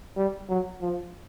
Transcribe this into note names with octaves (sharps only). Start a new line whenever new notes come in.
G3
F#3
F3